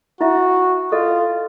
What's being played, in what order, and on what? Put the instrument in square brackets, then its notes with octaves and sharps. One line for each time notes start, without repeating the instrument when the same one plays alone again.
[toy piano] E4 E5 [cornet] F#4
[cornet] F4 [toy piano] A4 D#5